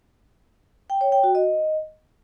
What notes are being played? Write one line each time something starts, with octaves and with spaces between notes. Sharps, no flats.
G5
C#5
G5
F#4
D#5